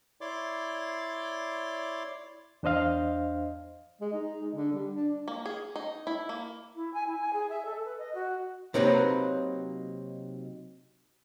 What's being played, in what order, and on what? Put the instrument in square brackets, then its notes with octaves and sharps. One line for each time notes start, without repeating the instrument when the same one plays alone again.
[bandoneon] E4 C#5 D5 C6 D6
[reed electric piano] E2 D4 C5 D#5 F5
[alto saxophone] G#3
D#4
G#3
D3
G3
D4
[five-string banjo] A#3
G#4
D#4
E4
A#3
[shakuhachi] E4
G#5
E4
G#5
G#4
E5
A4
B4
D#5
F#4
[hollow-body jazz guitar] C3 F#3 A#3 C4 D#4 B4